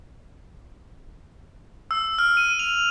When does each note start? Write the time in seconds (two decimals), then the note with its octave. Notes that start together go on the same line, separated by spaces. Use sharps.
1.91 E6
2.19 F6
2.37 D#7
2.59 F7